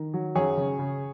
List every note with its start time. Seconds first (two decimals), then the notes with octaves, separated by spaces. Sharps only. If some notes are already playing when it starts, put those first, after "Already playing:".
Already playing: D#3
0.14 F#3
0.35 F#2 G#4 C#5
0.57 C#3
0.79 C#3